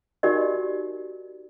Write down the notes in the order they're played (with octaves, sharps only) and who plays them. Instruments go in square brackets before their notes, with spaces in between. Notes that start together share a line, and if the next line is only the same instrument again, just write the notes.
[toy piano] D#4 F#4 G4 A#4 D5 D#5